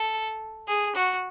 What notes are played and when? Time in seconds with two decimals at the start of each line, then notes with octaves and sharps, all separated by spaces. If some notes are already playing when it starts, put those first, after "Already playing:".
Already playing: A4
0.68 G#4
0.95 F#4